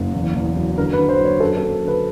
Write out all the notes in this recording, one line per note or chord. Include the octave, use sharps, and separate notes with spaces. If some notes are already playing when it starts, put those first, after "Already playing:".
Already playing: F#1
E2
E2
F#3
D3 A#4
B4
D3
C5
F#3
C#5
F#2 A4
A4
F#2
A#4
D3 B4